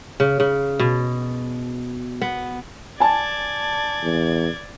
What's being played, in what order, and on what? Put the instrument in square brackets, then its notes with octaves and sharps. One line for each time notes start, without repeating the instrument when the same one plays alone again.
[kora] C#3
C#3
B2
B3
[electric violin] D5 G#6 [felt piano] G#5 A5
[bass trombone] E2